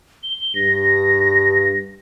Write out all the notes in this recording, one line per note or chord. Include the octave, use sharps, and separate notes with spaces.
G7
G2 A#6